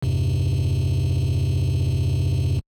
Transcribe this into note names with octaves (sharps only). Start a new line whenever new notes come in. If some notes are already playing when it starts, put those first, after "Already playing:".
E2 G2 C3